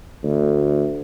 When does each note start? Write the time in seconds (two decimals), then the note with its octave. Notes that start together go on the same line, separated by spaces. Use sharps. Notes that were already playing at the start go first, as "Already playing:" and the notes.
0.23 D2